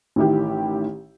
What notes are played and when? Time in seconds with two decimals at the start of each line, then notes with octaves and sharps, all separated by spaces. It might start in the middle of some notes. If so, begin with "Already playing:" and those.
0.16 A1 D#3 E4 G4